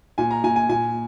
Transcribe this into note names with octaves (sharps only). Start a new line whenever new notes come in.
A#2 G#5
A#5
A#2 G#5
G#5
A#2 G#5